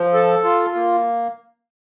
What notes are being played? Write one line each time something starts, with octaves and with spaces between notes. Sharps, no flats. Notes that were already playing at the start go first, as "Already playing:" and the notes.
Already playing: F3
A4
F4
A#3